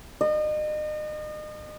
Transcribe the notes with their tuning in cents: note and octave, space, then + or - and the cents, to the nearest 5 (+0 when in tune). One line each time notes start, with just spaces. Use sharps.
D#5 -35